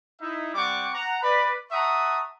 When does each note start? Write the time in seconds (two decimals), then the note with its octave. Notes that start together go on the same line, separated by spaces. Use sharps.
0.22 D#4 E4 E5
0.54 G3 C4 F#5 C#6 D6
0.94 F#5 A#5
1.23 B4 D5 B5
1.72 E5 F#5 A5 A#5 C#6 D#6